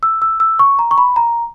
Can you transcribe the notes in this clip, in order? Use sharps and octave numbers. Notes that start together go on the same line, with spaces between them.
E6
E6
E6
C#6
A#5
C#6
B5
A#5